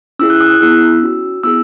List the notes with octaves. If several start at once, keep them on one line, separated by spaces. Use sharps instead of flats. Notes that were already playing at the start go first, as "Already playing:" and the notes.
C#4 E4 G#4 E6
F#6
D#6
F#6
B3 E4 G#4 E6
C#4 F#4
B3 E4 G#4 E6